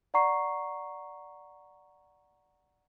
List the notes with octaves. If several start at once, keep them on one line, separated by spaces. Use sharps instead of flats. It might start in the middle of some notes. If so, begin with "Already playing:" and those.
D5 F#5 A#5 C#6 C7